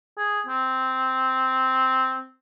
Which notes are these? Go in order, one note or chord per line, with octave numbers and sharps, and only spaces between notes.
G#4
C4